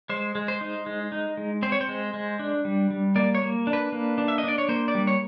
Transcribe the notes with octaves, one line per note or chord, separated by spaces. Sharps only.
G#3 C5
G#3
C5
D#4
G#3
D#4
G#3
C4 C5
C#5
C5
G#3
G#3
D4
G3
G3
A#3 D5
C#5
A#3
D4
B4
A#3
D4
E5
D#5
D4 D5
C#5
A#3 C5
D5
G3
C#5